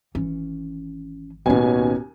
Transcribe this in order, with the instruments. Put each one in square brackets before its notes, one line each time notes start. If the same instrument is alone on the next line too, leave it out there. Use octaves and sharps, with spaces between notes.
[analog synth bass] G#1 [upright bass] E3 C#4
[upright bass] D1 D#4 [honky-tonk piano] D#2 C#4 G#5 [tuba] B2